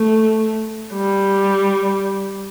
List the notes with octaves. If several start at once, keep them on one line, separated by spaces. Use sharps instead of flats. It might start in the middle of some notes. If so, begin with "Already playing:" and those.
Already playing: A3
G3